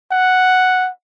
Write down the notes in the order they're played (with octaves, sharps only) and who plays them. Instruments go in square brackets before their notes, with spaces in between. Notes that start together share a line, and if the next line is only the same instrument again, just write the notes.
[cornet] F#5